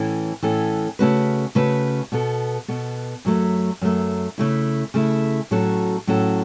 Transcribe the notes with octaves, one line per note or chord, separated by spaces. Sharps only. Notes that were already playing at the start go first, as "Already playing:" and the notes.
Already playing: A2 E3 C#4 A4
A2 E3 C#4 A4
C#3 A3 C#4 F#4 B4
C#3 A3 C#4 F#4 B4
B2 B3 A4
B2 B3 A4
F#2 F#3 A3
F#2 F#3 A3
C#3 A3 E4
C#3 A3 E4
A2 F#3 C#4 F#4 A4
A2 F#3 C#4 F#4 A4